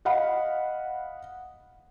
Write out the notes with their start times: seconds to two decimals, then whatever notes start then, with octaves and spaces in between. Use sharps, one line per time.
0.05 D#5 F5 F#5 B5